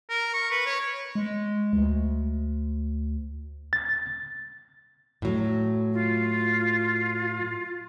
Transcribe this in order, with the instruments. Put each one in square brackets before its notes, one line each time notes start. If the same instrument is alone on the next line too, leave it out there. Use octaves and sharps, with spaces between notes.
[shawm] A#4
C#6
B4
C#5
[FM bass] G#3
D2
[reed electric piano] A6
[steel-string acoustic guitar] A2 F#3
[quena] F4